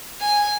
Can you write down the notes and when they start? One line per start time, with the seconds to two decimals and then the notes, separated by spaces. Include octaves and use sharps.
0.21 G#5